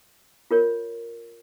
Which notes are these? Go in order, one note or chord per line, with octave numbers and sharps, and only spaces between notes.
F4 A#4 C#5